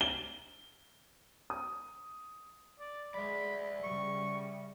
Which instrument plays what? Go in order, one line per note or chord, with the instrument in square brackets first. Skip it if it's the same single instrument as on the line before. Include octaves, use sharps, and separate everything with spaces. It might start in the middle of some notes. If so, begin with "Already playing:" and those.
[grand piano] G7
D#6
[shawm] D5
[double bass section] G#3 [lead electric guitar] D5 E5 [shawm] B5
[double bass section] C#3 G3 [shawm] C#6